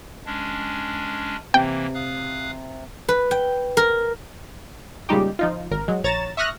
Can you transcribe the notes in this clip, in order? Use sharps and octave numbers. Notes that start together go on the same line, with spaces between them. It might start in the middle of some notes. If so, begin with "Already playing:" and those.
G#3 C#4 D4
C3 E3 A#3 G5
F5 D#6 F#6
B4
G5
A#4
A#2 C#3 G3 G#3 D#4 G4
F3 D#4 F4
G#1 A#4
F#3 G#3
A#1 C#5 A#5 A6 E7
E5 C#6 D#6 F6 F#6 A#6